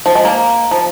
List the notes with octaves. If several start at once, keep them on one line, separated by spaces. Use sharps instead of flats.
F3
G#3
A#3
F3